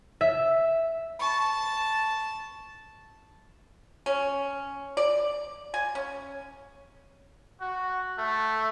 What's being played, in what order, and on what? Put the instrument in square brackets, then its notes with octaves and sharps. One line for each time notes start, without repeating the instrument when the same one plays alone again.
[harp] E5
[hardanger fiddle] A5 [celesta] B5 C#6
[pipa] C#4
D5
G#5
C#4
[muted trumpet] F#4
A3